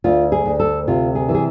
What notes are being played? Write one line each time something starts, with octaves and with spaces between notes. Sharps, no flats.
D2 F4
G#4
D2
A4
C3 F4
G#4
E3
G#4